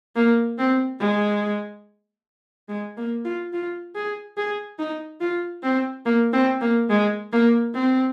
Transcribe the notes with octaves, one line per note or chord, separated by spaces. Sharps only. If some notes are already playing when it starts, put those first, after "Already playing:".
A#3
C4
G#3
G#3
A#3
F4
F4
G#4
G#4
D#4
F4
C4
A#3
C4
A#3
G#3
A#3
C4